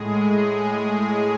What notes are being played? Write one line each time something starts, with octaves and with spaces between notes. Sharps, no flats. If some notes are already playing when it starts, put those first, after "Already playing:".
Already playing: A2 G#3 G#4